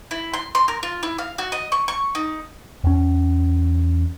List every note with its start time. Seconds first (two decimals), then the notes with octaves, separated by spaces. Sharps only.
0.11 E4
0.34 C6
0.55 C6
0.68 A#4
0.83 F4
1.03 E4
1.18 F5
1.38 F#4
1.52 D#5
1.72 C#6
1.88 C#6
2.15 D#4
2.84 E2 C#4